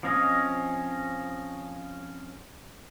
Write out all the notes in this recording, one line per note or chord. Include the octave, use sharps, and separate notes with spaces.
F3 C4 C#4 D#5